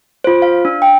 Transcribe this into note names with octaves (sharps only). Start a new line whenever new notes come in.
F4 C5
F5
D4
G5